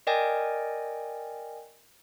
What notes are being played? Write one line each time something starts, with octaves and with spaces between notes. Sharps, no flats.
A#4 D5 D#5 G5 G#5